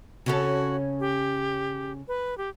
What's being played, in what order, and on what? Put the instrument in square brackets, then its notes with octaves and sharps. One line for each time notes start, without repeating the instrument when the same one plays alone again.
[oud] C#3 C#4 A4 [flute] F#4
[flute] G4
B4
G4